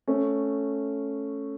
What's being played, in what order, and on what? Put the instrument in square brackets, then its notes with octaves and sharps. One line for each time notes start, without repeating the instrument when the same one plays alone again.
[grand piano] A3 C#4